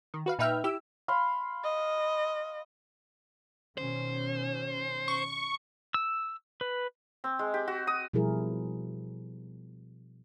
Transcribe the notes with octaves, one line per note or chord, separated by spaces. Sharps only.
D#3
F#4 B4 F5
A#2 D#4 B4 E5 G5 F6
E4 G4 E6
F5 B5 C6
D#5
B2 D#3 C#4 C5
C#6
E6
B4
C4
G#3
G4
F#4
D#6
B2 F3 G3 E4 G#4 A#4